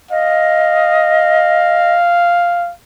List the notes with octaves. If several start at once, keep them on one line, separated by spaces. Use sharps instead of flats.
D#5 F5